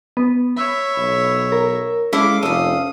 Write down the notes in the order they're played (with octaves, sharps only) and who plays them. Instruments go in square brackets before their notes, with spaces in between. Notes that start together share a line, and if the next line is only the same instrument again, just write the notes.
[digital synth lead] B3
[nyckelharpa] C#5 E5 [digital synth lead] B5
[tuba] B1
[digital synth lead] A#4
[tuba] G#3 [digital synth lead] C#4 [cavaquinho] E4 A4 F5 [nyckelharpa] D6
[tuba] F1 [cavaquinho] A4 F5 [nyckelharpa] D#6